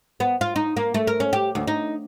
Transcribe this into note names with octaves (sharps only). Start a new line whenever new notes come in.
B3
F4
D#4
A#3
A3
A#4
C#4
G4
D2
D#4